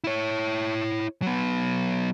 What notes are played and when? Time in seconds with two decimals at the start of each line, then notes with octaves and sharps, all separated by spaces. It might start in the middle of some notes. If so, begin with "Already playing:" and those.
0.04 E4 C#5
1.22 F#3 B3